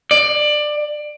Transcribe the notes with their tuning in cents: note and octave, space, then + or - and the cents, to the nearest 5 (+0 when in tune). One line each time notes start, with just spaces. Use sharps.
D5 +20